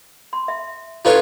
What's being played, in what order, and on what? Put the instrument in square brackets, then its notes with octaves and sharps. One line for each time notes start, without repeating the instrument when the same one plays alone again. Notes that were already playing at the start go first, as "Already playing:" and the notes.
[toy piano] C6
E5
[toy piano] D4 A4 A#5 [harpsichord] F4 B4 C#5